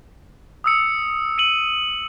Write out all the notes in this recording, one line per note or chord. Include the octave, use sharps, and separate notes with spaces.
D#6 E6 C#7
C#7 D#7 F#7